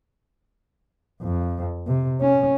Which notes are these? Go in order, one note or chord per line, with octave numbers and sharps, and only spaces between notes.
F2
C3
C#4